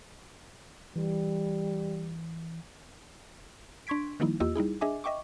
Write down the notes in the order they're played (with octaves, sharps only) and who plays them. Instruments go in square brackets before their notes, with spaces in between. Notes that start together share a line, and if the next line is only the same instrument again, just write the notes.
[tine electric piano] E3 [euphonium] G3
[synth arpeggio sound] D4 C6 C#6 G#6 B6 D7
D#3 F3 G3 A#3 D#4 E4
E2 A#3 F4 G4 D#5 E6
G3 D#4 E4 G#4
D4 G#4 D#5 E5 G#5 D6
D#5 E5 G5 C#6 D6